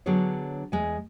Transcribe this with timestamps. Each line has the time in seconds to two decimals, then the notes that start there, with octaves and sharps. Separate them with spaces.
0.06 D3 F#3 B3 D4 G#4 C#5
0.72 E2 G#3 G#5